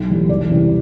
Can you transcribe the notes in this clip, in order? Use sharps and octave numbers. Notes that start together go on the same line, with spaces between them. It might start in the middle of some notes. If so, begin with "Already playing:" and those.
Already playing: B1
A2 E3 G3
E1 D5
E2 C3 G3